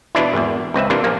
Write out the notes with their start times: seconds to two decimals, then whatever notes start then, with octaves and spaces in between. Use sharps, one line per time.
0.15 B2 E3 D4 E4
0.33 G#1 E2
0.74 C#2 C4 B4 E5
0.90 C3 E3 A#3 D4
1.04 A#1 A#3